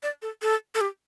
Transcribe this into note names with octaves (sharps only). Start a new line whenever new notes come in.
D5
A4
A4
A4
G4